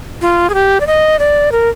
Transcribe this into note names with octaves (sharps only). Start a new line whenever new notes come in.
F4
G#4
G4
D5
D#5
D5
A#4